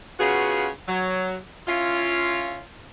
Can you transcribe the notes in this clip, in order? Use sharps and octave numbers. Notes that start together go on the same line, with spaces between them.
C#3 B3 F4 F#4 G#4
F#3
C#4 E4 F4